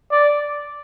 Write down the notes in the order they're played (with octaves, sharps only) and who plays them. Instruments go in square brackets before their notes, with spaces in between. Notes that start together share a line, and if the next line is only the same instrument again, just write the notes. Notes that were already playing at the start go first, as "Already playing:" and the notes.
[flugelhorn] D5